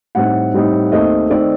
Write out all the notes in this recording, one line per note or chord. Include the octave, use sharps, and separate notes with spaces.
A2 G3 C4 D#4 F#5
A2 G3 C4 D#4
D#2 D#3 A3 C4 D#4 D#5
D#3 A3 C4 D#4 D5